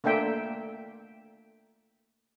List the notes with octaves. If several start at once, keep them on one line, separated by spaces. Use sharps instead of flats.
A3 A#3 D4 E5 G5